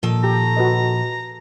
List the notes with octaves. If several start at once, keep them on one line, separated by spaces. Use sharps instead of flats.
A#2 D#3 F3 A4
G4 A#5
F#4 B4 D#5